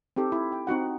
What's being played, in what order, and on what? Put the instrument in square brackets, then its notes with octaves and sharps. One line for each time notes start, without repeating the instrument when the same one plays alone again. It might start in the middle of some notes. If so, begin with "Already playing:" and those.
[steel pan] C4 D#4 G4 A4
E4
G5
C4 D#4 F#4 F#5